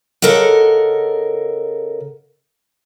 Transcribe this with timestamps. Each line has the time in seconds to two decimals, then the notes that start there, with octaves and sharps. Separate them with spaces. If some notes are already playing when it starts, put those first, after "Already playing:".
0.22 C#3 A4 A#4 D#5 F#5